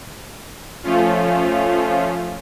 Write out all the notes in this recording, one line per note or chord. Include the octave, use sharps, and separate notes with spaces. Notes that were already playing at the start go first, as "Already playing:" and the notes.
F3 A3 C#4 F4